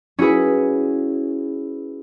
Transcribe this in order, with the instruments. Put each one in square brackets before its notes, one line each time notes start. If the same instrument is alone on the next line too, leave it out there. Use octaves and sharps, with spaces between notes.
[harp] C#4 E4 F#4 G#4 B4